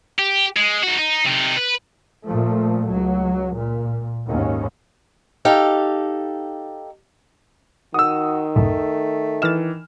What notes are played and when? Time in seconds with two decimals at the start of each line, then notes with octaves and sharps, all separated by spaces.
0.19 G4
0.56 G#3
0.83 D#4 F#4
0.98 D#4
1.26 C3 D#4
1.56 B4
2.25 A#2 F3 A3
2.88 C#2 F#3
3.57 A#2
4.28 D#2 G#2 C#4
5.45 D#4 G4 A4 F5
7.94 D#3 F#4 D#6 E6
8.56 C2 F#2 A2 A3
9.42 E3 D#5 F6 A6 E7